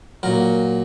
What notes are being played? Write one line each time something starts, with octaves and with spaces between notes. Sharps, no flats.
A#2 F#3 A#4